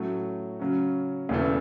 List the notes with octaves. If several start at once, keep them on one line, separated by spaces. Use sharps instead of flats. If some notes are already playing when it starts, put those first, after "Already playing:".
Already playing: A2 F#3 A3 C#4 F#4
C#3 F#3 C#4
E1 E2 C#3 E3 A3